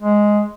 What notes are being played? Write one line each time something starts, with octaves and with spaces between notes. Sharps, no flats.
G#3